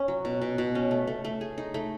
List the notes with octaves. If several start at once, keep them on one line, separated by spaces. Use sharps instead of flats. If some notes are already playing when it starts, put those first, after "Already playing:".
Already playing: C#4
F#3
B2
B2
B2
C#4
A3
A3
A3
G#4
D#4
A3